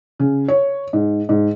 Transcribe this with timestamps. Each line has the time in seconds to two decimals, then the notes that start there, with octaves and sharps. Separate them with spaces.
0.20 C#3
0.48 C#5
0.93 G#2
1.29 G#2